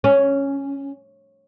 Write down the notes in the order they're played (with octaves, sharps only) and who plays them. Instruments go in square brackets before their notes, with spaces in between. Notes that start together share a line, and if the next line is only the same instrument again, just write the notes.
[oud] C#4